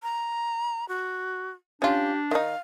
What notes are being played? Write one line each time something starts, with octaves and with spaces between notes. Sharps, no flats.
A#5
F#4
C#4 D4 F4 G4
D#3 D#4 F5